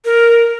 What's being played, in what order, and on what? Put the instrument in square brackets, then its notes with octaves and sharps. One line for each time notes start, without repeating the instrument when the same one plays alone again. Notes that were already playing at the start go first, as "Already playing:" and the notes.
[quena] A#4